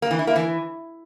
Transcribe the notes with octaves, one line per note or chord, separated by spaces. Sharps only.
A#3
E3
E4
A#3
E3